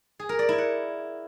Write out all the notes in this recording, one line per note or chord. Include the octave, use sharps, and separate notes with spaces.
G#4
A#4
D5
E4
F#5